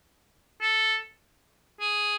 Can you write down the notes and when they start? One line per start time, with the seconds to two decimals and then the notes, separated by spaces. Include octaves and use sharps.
0.62 A4
1.81 G#4